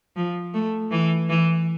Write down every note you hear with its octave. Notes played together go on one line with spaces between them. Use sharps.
F3
A3
E3
E3